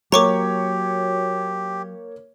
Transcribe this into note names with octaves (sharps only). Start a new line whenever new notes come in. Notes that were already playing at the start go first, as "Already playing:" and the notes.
F#3 A#3 G4 C#5 A#5 C#6 D6